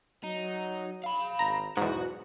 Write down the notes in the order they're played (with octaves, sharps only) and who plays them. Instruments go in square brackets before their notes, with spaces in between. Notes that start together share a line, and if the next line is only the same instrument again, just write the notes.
[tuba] F#3 [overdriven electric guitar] D#4
[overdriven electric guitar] F5 B5
[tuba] G#1 [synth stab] A#5
[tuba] B1 [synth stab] E2 G#2 [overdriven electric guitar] F#4